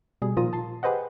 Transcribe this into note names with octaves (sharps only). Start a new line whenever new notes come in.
B2 G3 G#4
A#2 D#3 F3 F4 A#5 D#6
A5 C6
G4 G#4 B4 C5 D#5 F#5